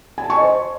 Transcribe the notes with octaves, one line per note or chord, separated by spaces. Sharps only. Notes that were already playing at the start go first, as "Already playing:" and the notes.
G#5
A5
C#6
D#5
C5